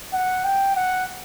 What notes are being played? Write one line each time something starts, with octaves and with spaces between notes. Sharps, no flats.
F#5
G5
F#5